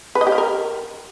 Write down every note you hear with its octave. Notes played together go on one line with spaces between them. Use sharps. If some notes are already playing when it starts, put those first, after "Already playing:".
B4
D#5
G4
F5
A#4